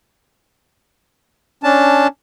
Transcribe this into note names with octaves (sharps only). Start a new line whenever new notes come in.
C#4 D4 A5